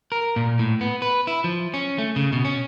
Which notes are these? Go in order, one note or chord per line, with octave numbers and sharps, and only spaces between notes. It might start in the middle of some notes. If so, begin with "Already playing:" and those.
A#4
A#2
A2
B3
B4
E4
F3
C#4
A3
C#3
B2
C#4